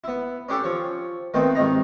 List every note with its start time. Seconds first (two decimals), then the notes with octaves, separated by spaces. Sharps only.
0.04 B3 E4
0.49 C#4 D4 G4 A4
0.64 F3 C#5
1.34 D#3 A3 B3 C4 D#4
1.55 C2 G#2 D#3 D#4 A#5